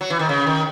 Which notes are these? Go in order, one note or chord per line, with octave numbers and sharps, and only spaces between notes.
F#3
E3
D#3
C#3
D#3